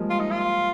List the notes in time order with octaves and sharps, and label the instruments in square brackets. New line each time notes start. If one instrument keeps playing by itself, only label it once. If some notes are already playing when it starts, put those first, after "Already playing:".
Already playing: [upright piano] F3 G3 G#3 A#3
[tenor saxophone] F4
D#4
F4